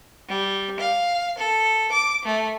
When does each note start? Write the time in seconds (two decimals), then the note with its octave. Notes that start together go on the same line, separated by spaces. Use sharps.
0.28 G3
0.80 F5
1.39 A4
1.91 D6
2.25 A3